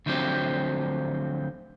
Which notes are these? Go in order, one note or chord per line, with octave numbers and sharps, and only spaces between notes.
D2 D3 F3 F#3 C4 G4